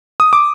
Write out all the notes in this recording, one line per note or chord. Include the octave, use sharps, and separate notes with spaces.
D#6
D6